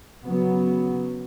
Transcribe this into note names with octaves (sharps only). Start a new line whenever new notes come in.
C#3 F#3 B3